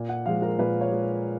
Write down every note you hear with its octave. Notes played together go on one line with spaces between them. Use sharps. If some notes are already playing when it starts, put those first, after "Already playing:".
Already playing: A#2
F#5
F3 G#3 F5
A#4
A#2 B4
C#5
G#3